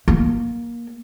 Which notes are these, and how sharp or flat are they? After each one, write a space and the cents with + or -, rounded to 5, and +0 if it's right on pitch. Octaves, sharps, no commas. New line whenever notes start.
A#3 +15